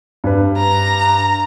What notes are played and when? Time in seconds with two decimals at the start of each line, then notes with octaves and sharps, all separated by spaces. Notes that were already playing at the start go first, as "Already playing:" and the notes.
0.24 G2 B4
0.58 A#5